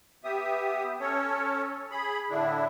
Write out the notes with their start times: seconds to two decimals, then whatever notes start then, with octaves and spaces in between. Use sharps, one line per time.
0.24 B3 G4 E5 D#6
1.00 C#4 A4 C#5
1.91 G#4 B5
2.30 A2 D3 D4 E4